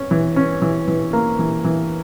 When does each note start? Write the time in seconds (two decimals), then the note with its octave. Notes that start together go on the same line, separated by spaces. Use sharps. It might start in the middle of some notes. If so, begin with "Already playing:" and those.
Already playing: C#4
0.11 E3
0.36 C#4
0.62 E3
0.88 E3
1.13 A#3
1.39 E3
1.64 E3